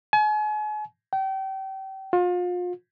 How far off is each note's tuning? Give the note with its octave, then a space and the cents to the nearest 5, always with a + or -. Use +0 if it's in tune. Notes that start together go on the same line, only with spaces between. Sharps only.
G#5 +40
G5 -30
F4 +35